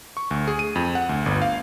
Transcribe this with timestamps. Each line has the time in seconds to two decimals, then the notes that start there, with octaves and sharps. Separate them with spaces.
0.17 C#6
0.31 D2
0.47 G#4
0.59 D#7
0.75 F2
0.95 F#5
1.09 D2
1.26 G1
1.42 F5